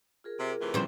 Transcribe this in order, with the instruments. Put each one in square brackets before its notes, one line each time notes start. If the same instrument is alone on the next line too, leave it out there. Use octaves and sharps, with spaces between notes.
[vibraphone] F4 G#4 A#4
[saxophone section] C3
A2 C3 E3
[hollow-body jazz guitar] C#3 F3 B3 [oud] G3 C5